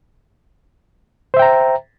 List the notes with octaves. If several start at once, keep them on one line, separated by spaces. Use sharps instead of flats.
C5 E5 G5 A#5